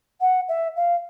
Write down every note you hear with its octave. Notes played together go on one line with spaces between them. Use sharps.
F#5
E5
F5